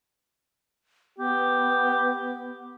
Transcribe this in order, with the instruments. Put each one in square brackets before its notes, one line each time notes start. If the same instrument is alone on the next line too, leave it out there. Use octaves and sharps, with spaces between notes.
[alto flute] B3 [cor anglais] G4